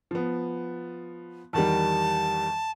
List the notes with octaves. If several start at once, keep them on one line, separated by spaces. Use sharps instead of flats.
F3 B3
E2 D#3 G3 A5